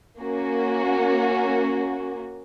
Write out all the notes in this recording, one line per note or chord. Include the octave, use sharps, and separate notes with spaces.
A#3 C#4 F#4